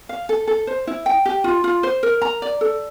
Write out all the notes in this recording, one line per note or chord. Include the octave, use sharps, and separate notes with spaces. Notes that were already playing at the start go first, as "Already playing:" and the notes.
F5
A4
A4
C5
E4
G5
G4
F4
F4
C5
A#4
A#5
D5
A4